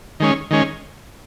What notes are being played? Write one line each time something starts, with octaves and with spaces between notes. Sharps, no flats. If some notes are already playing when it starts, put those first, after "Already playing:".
D#3 G#3 C#4
D#3 G#3 C#4